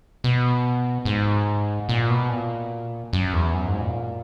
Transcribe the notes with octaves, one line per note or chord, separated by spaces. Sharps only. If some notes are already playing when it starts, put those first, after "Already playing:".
B2
G#2
A#2
B2
A#2
F#2
E2
F#2
G#2
A#2